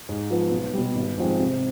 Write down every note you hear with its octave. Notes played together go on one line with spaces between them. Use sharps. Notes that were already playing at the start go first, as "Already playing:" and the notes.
G#2
F3 B3 F4
B1
B2 G3
G#1
G#2 F3 G#3 C4
C3